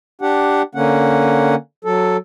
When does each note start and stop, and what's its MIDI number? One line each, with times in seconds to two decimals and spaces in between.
0.21 0.62 62
0.21 0.62 67
0.21 0.62 78
0.75 1.55 50
0.75 1.55 58
0.75 1.55 61
0.75 1.55 78
1.84 2.17 54
1.84 2.17 69